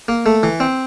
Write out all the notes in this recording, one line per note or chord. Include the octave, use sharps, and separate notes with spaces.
A#3
A3
E3
C4